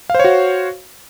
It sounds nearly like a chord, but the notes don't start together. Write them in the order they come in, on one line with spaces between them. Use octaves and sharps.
F5 C5 C#5 F#4